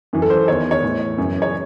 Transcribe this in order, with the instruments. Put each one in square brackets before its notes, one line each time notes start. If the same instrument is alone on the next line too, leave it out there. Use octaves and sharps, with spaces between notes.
[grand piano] F#2 E3
A4
C5
E2 D#3 C#5
C#5
A2 E3
F#2 C#3 E3
C#5